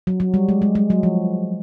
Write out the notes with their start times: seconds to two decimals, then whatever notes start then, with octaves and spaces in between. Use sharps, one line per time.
0.07 F#3
0.20 F#3
0.34 G3
0.49 G#3
0.62 G#3
0.75 G#3
0.90 F#3
1.03 F3